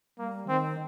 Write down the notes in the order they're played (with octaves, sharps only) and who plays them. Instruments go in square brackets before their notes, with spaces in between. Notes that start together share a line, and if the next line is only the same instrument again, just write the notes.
[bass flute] G3 [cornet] A#3
[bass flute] D#3 [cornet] C4